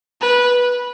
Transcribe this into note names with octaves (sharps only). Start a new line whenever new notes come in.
B4